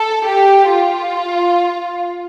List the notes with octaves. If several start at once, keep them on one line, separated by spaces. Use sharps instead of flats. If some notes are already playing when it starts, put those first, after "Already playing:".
Already playing: A4
G4
F4